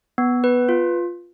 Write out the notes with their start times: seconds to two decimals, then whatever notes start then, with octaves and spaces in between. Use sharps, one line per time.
0.18 B3
0.44 B4
0.69 F4